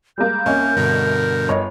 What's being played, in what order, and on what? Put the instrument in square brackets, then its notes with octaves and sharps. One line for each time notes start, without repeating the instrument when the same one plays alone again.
[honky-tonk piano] G3 G#3 A#3 [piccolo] G6
[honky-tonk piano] C2 C#5 D#5 [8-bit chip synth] A#3 [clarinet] C#4
[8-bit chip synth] G2 B2 D3 [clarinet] A#4
[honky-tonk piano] G1 C#5 D#5